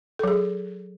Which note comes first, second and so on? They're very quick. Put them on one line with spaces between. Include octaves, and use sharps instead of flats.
A4 F#3 G#4